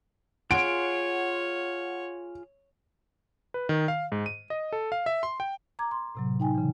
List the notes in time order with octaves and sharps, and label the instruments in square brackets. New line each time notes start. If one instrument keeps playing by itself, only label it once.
[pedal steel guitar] F4 G#4 C6 [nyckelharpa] C#5 [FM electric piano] F#5 [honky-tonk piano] D7
[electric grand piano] B4
D#3
F5
G#2
D#7
D#5
A4
F5
E5
C6
G5
[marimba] A#5 D6 G#6
C6
A2 C3 F#3
D#4 G5 G#5
C#3 E3